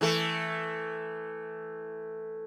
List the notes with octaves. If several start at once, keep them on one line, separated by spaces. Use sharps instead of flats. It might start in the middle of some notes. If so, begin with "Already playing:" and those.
E3 A3 A4